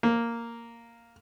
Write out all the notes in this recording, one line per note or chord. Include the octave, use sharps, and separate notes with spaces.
A#3